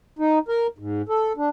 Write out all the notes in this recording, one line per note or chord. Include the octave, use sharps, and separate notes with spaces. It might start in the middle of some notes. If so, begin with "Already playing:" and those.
D#4
A#4
G#2
A4
D4